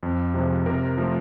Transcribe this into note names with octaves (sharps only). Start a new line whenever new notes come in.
F2
C3 F3 G#3
C3 A#4
F3 A3